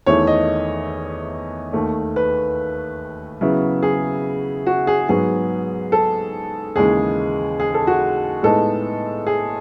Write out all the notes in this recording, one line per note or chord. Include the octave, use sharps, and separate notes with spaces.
E2 D#3 A3 E4 C#5
D#5
D#2 D#3 A3
B4
C#3 F#3 B3 E4
G#4
F#4
G#4
G#2 F#3 B3 G#4
A4
D#2 C#3 E3 G#3 G#4
G#4
A4
F#4
A2 G#3 B3 D#4 A4
G#4